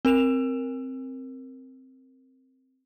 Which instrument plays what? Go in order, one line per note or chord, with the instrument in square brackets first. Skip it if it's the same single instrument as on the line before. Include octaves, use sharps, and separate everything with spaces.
[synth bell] C4 A#4 E7 F7